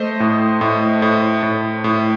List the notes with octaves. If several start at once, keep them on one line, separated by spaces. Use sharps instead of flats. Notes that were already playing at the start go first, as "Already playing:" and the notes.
Already playing: A3 C5 D#5
A2
A2
A2
A2
A2